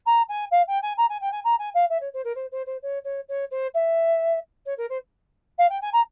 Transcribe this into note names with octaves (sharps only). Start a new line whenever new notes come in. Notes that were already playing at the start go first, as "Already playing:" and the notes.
A#5
G#5
F5
G5
G#5
A#5
G#5
G5
G#5
A#5
G#5
F5
E5
C#5
C5
A#4
C5
C5
C5
C#5
C#5
C#5
C5
E5
C#5
A#4
C5
F5
G5
G#5
A#5